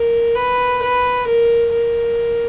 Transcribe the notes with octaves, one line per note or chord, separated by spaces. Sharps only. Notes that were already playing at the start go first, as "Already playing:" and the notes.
Already playing: A#4
B4
B4
A#4
A#4